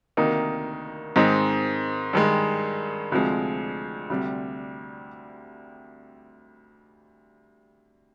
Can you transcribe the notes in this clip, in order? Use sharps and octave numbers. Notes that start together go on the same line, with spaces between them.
D2 C3 D#3 A#3 D#4
G#2 D#3 G#3 C4 D#4
G2 D#3 G#3
D2 C3 F3 G#3
D2 C3 G3